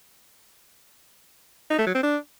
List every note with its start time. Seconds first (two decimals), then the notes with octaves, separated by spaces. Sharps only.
1.70 D#4
1.78 A3
1.87 F#3
1.95 C4
2.03 D4